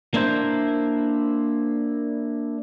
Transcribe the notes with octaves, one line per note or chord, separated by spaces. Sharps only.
A#3 D4 E4 C5